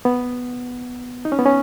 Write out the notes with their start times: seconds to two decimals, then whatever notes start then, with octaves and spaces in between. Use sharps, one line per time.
0.05 B3
1.25 D#4
1.32 C#4
1.39 B3
1.46 C#4